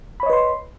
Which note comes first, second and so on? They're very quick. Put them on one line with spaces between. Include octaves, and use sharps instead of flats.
B5 C#5 D#5 B4 C6